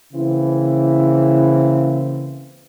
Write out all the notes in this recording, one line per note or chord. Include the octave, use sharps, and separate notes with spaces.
C#3 E3 A#3 C4 E4